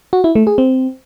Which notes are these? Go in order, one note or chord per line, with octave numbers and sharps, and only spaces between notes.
F#4
E4
A3
G#4
C4